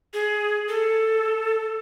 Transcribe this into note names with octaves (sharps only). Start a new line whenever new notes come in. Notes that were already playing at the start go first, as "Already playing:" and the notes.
G#4
A4